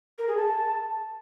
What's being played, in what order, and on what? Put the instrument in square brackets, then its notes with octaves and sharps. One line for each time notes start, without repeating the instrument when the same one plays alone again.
[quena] A#4
G#4
A5